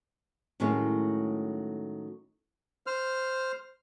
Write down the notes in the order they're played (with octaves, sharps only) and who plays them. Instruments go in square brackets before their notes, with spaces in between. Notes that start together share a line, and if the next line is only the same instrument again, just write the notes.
[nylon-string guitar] A2 D#3 F#3 G#3 A3 C#4
[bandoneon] C5 F6